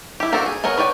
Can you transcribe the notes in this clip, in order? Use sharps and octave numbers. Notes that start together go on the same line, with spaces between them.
E4 G4
A#3 C4 D4 F#4 A4
G#4
B3 G#4 A#4 C#5
B4 C#5 D5 G5